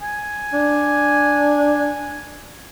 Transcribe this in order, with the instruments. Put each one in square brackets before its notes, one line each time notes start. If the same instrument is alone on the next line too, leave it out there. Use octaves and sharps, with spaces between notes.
[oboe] G#5
[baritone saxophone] D4